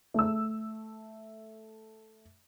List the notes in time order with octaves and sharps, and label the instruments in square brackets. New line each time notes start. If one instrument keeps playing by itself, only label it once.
[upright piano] A3 E6